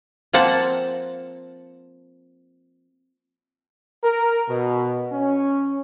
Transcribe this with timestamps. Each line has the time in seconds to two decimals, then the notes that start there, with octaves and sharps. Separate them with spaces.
0.33 F3 A#3 C4 F#5 A5
4.04 A#4
4.49 B2
5.12 C#4